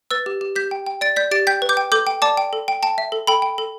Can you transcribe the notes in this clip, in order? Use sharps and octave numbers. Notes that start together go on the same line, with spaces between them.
B4 E6 A6
G4
G4
G4 G6 B6
G5
G5
D5 A6 D7
D5 G6 B6
G4 A6 D7
G5 G6 B6
B4
D6 G6
G5
A4 D6 G6
G5
D5 A5 D6
G5
A4
G5
G5 A5
E5
A4
A4 G5 B5
G5
A4